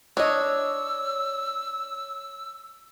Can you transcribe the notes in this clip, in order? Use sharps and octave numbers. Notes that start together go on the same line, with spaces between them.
D4 C#5 D#5 E6